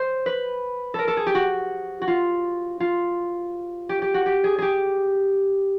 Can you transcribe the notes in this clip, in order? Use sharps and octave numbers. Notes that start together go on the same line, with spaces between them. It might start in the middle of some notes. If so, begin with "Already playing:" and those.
Already playing: C5
B4
A4 A#4
A4
G#4
G4
F#4
F#4
F4
F4
G4
G4
F#4
G4
G#4
G4 G#4